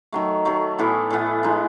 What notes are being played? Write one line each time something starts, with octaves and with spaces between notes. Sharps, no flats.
D#3 F#3 A3
D#3 F#3 A3
A2 E3 B3
A2 E3 B3
E3 G#3 D#4